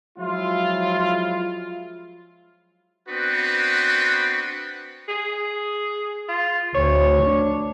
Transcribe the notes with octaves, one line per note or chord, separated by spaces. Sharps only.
F3 F#3 G#3 E4 F4
B3 C4 D4 F#4 B4
G#4
F4
D2 C#5
D4